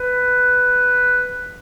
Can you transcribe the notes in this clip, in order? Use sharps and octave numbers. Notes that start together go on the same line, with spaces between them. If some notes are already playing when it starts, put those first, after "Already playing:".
Already playing: B4